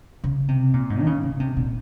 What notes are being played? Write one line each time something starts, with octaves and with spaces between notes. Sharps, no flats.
C#3
C3
A#2
G#2
D#3
C#3
C#3
C3
A#2